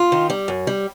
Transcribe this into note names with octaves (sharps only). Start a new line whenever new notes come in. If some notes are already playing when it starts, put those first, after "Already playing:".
Already playing: F4
D#3
G3
F#2
G3